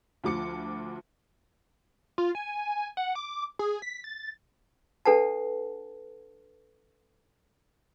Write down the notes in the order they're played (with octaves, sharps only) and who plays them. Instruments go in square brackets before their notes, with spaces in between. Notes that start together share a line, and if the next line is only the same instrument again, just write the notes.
[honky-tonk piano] D2 F3 D6 C#7
[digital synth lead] F4
G#5
F#5
D6
G#4
B6
A6
[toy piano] D4 A4 B4 F#5 A5